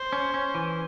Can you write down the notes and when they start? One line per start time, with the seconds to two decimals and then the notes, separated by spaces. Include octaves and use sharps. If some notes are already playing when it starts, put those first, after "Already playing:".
Already playing: C5
0.13 C#4
0.34 C#4
0.55 E3